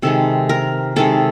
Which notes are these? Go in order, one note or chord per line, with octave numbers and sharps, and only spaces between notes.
C3 D#3 G#3 A4
A#4
C3 D#3 G#3 A4